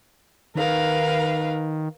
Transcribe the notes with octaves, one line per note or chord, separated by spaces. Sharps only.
D#3 A#4 B4 F5